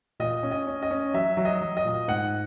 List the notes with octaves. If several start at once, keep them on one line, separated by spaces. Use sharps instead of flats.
A#2 D#5
C#4
D#5
C#4
D#5
C#4
F#3 E5
F#3
D#5
F#3
D#5
A#2
G#2 F#5